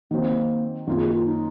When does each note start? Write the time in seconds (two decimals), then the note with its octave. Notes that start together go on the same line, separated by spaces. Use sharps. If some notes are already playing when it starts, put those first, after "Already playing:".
0.11 D#3 F#3 A#3 C4
0.87 F#2 D#3 A#3 C4 F4
0.97 G#4
1.06 F#4
1.16 F4
1.25 D#4